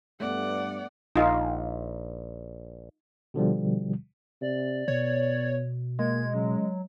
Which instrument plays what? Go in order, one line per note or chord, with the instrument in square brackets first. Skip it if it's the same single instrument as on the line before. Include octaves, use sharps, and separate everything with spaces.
[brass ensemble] G2 [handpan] A3 B3 [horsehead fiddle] D5 [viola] F#5
[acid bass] A#1 [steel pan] D#4 F4
[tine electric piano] B2 D3 F3 G3
[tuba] C3 [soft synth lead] D5
[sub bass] B2 [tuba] B3 [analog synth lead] C#5
[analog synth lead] G#3 [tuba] A#3 [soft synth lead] G#6
[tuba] C#3 [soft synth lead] F#3